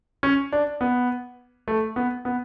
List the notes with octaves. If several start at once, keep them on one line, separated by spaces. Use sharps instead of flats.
C#4
D4
B3
A3
B3
B3